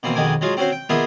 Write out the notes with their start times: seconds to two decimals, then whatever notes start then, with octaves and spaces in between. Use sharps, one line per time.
0.03 B2 E3 A#3 C4
0.15 F2 B2 D#3 G#3 G#5 D6
0.41 F#3 G#3 F4 F#4
0.57 C4 C#4 F#4 C5
0.72 G5
0.89 A#3 B3 F4 G#4 D#5 E5